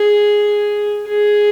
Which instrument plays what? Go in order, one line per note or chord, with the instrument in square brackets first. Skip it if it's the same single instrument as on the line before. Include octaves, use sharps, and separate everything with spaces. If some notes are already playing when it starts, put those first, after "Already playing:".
Already playing: [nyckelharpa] G#4
G#4